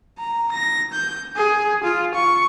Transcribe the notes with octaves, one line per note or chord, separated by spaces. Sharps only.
A#5
A#6
G6
G#4
F4
C#6